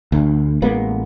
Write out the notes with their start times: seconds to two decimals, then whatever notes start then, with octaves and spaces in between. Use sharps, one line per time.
0.12 D2
0.62 A1 G#3 A#3 B3